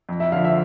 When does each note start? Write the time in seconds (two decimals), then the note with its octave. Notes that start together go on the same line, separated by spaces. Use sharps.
0.09 F2
0.20 E5
0.32 D3 F3 F5
0.45 E5